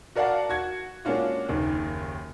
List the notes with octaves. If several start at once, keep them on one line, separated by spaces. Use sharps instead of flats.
F#4 A#4 D5 F5 F#5 A5
F#4 G#6
G#3 A#3 C#4 D4 F4 F#4
F#1 D#2 D#3